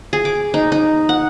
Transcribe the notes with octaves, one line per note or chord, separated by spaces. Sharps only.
G#4
D6
D#4
D#4
F#5